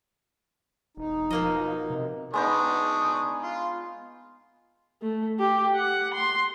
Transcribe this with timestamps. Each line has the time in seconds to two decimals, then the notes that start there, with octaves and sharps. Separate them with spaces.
0.97 E1 D#4
1.31 B2 F3 A#3 D#5
1.90 C3
2.34 G#3 B3 D4 D#4 C#6 D#6
3.43 F4 C6
5.01 A3
5.39 G4
5.76 F#5
6.14 C6